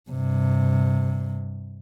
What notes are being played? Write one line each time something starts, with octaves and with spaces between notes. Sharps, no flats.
G2 C3